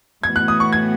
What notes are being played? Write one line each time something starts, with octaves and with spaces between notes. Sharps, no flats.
A2 E3 B3 F#4 G#6
F#6
D#6
C#6
G#6